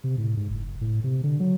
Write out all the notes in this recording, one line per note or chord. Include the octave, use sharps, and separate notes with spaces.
C3
A2
G#2
F#1
A2
C3
D3
F#3